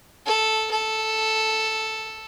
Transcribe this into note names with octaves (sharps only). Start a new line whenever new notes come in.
A4
A4